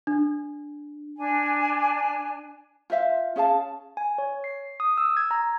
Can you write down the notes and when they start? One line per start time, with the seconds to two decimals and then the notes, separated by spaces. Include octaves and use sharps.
0.07 D4
1.17 D4 G#5
2.90 F4 C5 E5 F5
3.36 C#4 G#4 F5 A5
3.97 G#5
4.18 C#5
4.44 C7
4.80 D#6
4.98 E6
5.17 G#6
5.31 A#5